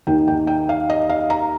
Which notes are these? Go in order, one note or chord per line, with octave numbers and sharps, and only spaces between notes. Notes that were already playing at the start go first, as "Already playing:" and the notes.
D#2 D#3 G5
G5
G5
F5
D#5
F5
A#5